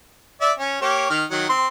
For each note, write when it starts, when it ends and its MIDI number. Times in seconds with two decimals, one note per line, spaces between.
0.41 0.52 74
0.41 0.52 76
0.59 0.79 61
0.82 1.08 58
0.82 1.08 67
0.82 1.08 73
1.10 1.25 51
1.10 1.25 89
1.31 1.48 51
1.31 1.48 54
1.31 1.48 78
1.49 1.67 60
1.49 1.67 84